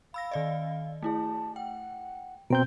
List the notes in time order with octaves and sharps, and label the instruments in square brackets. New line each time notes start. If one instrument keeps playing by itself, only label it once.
[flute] F5 [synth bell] B5 E6 A#6
[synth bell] D#3 D5 D#5
[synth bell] A3 E4 G#4 [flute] A5
[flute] F#5 [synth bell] G5
[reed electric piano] B2 C4 G6 [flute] A#5 [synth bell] D7